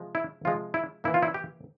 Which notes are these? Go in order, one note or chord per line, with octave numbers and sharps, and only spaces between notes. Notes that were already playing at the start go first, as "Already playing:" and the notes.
Already playing: C3 F3 G#3
E4
C3 F3 G#3 F4
E4
E3 A#3 E4
F4
E4
G4